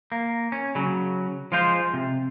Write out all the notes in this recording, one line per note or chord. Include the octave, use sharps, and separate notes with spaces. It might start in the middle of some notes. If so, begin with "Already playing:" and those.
A#3
C#4
C#3 F#3
F3 G#3 F4 C5
C3